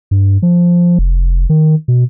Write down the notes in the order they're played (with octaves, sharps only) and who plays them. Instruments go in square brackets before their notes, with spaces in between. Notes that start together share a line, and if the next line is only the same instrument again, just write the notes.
[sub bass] G2
F3
F1
D#3
B2